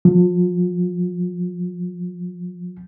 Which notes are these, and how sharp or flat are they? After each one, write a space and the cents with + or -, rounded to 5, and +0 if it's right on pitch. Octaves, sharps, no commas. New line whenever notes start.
F3 +35